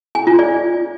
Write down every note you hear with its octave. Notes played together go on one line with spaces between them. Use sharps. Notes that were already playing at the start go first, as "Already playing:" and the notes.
G#5
F4
D5